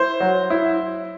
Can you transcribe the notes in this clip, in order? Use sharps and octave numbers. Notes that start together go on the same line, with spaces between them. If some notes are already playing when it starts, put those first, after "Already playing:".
Already playing: E4 C5
F#3
E4